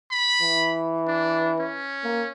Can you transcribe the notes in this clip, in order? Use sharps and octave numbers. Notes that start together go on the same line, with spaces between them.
B5
E3
D4
C#4
A#3